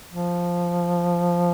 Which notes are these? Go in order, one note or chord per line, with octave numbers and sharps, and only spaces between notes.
F3